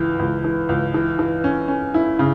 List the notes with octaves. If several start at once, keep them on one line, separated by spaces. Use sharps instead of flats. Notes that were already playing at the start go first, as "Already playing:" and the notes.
Already playing: C#2 E3
C#2
E3
C#2
E3
E3
C#4
C#4
E4
C#3